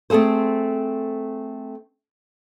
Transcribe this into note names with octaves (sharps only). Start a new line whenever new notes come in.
A3 C4 G#4 A4 C5